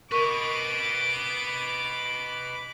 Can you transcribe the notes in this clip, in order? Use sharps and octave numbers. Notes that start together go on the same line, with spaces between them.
A#4 B4 D#5 C#6 D6